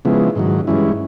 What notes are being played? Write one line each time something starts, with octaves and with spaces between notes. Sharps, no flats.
C#3 F3 G#3 B3 E4
G#2 D#3 F#3
G2 E3 G#3 C#4 E4